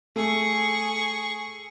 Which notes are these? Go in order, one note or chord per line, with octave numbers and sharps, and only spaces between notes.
A3 G#4 C#6